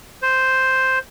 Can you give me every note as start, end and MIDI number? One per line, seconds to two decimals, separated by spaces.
0.22 0.98 72